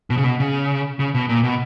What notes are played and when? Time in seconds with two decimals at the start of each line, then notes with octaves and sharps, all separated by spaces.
0.10 B2
0.17 C#3
0.24 B2
0.40 C#3
0.99 C#3
1.15 B2
1.29 A#2
1.44 B2